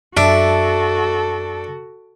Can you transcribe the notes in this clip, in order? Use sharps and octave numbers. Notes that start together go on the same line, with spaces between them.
F#2 D4 F#4 A4 E5